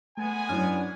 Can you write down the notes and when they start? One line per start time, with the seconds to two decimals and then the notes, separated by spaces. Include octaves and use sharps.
0.17 G#3 A3 B3 G#5
0.49 F#2 D4 E4 F6